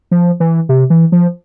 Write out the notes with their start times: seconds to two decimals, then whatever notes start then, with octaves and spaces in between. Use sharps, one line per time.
0.11 F3
0.40 E3
0.69 C3
0.90 E3
1.12 F3